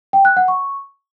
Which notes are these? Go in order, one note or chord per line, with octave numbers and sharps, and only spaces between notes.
G5
F#6
F#5
C#6